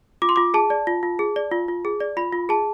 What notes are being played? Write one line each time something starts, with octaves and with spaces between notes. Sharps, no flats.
F4 D6
C6
F4 D6
G#4 A5
D5
F4
F4
G#4
D5
F4
F4
G#4
D5
F4 B5
F4
G#4 A5